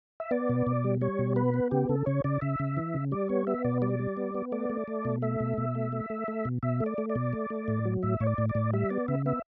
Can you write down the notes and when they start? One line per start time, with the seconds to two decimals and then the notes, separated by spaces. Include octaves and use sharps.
0.20 E5
0.31 B3 D5
0.49 B2
0.67 B2
0.84 G3
1.01 G3 C#5
1.19 B2
1.36 B3 B4
1.54 B3
1.71 C#3 G4
1.89 C#3 A4
2.06 C#3 C#5
2.24 C#3 D5
2.41 C#3 E5
2.59 C#3
2.77 E3
2.94 C#3
3.12 G3 D5
3.29 B3 C#5
3.47 B3 E5
3.64 B2 D5
3.82 G3 D5
3.99 G3
4.17 B3
4.35 B3
4.52 A3 D5
4.70 A3
4.88 A3
5.05 B2
5.22 A3 E5
5.40 B2
5.58 B2
5.75 A3
5.92 A3
6.10 A3
6.28 A3
6.45 B2
6.63 B2 E5
6.80 A3
6.86 D5
6.98 A3
7.10 D5
7.15 B2
7.33 A3
7.50 A3
7.68 A2
7.85 F#3
8.03 A2 E5
8.20 A2 C#5
8.27 D5
8.38 A2
8.49 D5
8.55 A2
8.73 G3 E5
8.90 B3 D5
9.08 C#3 E5
9.26 B3 E5